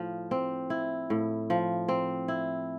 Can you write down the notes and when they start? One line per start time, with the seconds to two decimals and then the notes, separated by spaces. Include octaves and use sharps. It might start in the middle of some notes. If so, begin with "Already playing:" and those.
Already playing: A2 F3
0.31 C4
0.70 E4
1.10 A2
1.50 F3
1.88 C4
2.28 E4